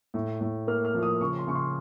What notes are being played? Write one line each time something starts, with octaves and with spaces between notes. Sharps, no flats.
A2
A2
A#3 F6
F6
F3
D#6
C#3 C#6
C6
C#3 C#6
C6